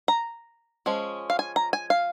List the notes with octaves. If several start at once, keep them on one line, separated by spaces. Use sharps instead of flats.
A#5
F3 G#3 C#4
F5
G#5
A#5
G#5
F5